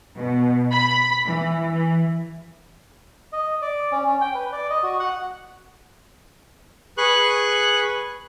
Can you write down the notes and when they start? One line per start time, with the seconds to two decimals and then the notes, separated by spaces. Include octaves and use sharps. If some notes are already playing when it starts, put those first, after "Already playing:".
0.16 B2
0.71 B5
1.25 E3
1.73 E3
3.33 D#5
3.62 D5
3.92 C#4
4.07 C#4
4.21 G5
4.35 B4
4.52 D5
4.70 D#5
4.83 F#4
4.99 F#5
6.98 G#4 B4 C#6 F#6